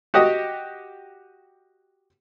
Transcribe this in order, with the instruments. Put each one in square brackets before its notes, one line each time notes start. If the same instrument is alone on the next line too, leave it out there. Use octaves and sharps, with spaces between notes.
[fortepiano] F#4 G4 D#5 D#6